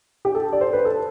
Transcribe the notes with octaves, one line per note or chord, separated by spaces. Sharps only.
G4
A4
D5
C5
B4
A4